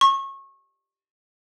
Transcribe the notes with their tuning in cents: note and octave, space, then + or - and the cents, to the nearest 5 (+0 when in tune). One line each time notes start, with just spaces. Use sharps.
C#6 -25